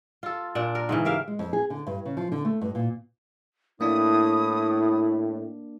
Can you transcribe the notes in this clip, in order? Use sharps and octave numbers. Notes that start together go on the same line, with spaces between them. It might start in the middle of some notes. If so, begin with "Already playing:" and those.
F4 A4
A#2 D4
A#4
G#2 C#3 E3
G4 A#4 E5 F5
G#3
F2
G#4
D3
G2
C#3
F3
D3
A3
G2
A#2
A2 A#3 D4 E4 D5 D#6